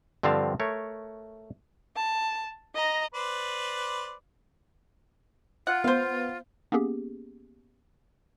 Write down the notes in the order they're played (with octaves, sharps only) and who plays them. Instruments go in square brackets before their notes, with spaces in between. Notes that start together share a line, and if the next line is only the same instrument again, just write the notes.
[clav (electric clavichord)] G2 D3 F3 C4 F5 A5
A3 A#4 C#5
[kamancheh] A5
D#5 A#5
[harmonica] B4 C5 D5
[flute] F4 [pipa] F#5
[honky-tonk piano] B3 [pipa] C5 F5
[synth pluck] A#3 B3 C#4 G4 G#4